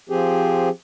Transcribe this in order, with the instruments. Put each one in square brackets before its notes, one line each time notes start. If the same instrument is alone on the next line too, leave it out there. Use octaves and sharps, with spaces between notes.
[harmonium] F3 C4 G4 G#4